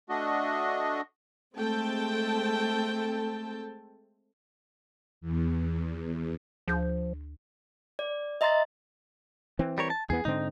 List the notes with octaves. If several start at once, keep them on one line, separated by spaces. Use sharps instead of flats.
A3 D4 F#4 D#5
G#3 A3 C4 A4 G5 A5
E2
D2 F3 G#4 G6
D5
D#5 E5 A#5 C6 A6
E3 C4
G3 A#4 C#5
A5
E2 E3 B3 G#4
G#2 D3 C4 D#4